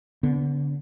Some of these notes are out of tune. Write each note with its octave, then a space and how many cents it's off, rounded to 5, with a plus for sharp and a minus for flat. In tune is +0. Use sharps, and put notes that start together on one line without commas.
D3 -35 B3 +0